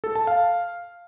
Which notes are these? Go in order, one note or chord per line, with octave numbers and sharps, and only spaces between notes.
A4
A5
F5